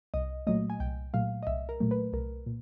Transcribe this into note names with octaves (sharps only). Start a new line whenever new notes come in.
C2 D#5
A#2 F#3 A3 D#5
G#5
C2 G5
A#2 F#3 A3 F5
D#5
C2 E5
A#4
A#2 F#3 A3
B4
C2 A#4
A#2